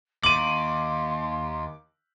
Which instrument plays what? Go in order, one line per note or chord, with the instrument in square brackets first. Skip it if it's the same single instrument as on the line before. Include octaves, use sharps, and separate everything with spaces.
[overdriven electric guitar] D#2 [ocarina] C6 [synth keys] D6 [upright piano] D#7 F#7